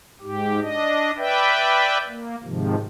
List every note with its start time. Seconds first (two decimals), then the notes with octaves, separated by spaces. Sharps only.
0.21 G#2 G4
0.61 D4 D#5
1.17 B4 D5 E5 G5
2.08 A#3
2.44 G#2 C3 D#3 F3